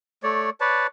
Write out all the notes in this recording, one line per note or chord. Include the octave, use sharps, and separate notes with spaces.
A3 C#5 D5
B4 C#5 D5 A5